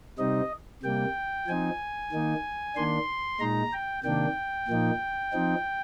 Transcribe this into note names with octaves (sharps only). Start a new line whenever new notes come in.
C3 G3 C4 D#4 D#5
C3 G3 A#3 G5
F3 C4 D#4 G#5
D#3 A#3 D#4
D#3 A#3 D4 C6
A#2 G#3 D#4 A#5
G5
C3 D#3 A#3 D4 G5
A#2 F3 A#3 D#4
F3 C4 D#4